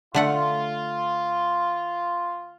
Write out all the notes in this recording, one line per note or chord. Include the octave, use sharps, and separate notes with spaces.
D3 A3 F4 F#5